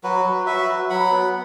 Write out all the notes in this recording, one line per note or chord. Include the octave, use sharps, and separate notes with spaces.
F#3 F#4 B4
F#3
F#4 B4 E5
F#3
F#3 F#5 B5
B3